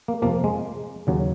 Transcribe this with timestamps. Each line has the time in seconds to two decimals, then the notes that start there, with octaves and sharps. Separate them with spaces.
0.08 A#3
0.22 F2 C3 F3 A#3
0.44 G#3
1.07 D#2 C#3 F#3